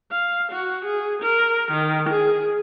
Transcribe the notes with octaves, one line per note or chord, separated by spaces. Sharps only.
F5
F#4
G#4
A#4
D#3
G#4